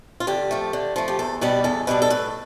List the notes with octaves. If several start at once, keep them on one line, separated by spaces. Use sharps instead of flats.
F4
D3 G4
F3 A3
D3
F3 A3
G4
E2 A4
B2 G3 B3 D4 G4
E2 A4
B2 G3 B3 D4 B4
A4
A2 B4